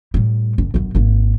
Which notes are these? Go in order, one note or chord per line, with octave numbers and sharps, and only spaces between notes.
A2 G3
F#1
G1 F#2
G#1 A#3